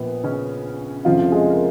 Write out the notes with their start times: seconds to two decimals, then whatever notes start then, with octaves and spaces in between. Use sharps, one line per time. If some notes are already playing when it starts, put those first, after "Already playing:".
Already playing: A#1 A#2 B3
0.24 C#3 C#4
1.05 F1 F2 C#3 F3 F4
1.32 G#3 G#4
1.50 A#4